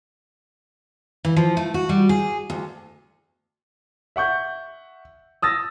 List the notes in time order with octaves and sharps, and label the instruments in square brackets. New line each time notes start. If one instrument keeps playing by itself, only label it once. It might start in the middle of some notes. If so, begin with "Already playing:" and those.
[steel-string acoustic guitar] E3
F3
A3
F#4
G3
G#4
D2
[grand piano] E5 F#5 C#6 G6
D#6 E6 A6 A#6